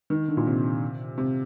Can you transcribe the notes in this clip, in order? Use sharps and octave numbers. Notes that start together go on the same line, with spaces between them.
D#3
D3
A#2
C3
C3